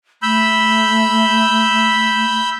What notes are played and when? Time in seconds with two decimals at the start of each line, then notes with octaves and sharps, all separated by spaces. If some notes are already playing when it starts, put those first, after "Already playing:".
0.22 A3 B5 E6 G6